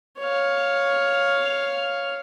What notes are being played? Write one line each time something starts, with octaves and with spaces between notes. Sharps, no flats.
C#5 F5